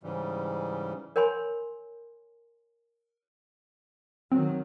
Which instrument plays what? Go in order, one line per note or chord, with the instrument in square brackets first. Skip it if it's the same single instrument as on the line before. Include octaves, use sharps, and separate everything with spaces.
[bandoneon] G#2 C#3 E3 G3
[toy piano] A#4 C#5 G#5 B5 C6
[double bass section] D#3 F#3 [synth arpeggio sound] C4